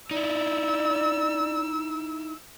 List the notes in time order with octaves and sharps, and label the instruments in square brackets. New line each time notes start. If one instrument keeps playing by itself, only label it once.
[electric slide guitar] D#4 E4 [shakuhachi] D5 [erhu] E6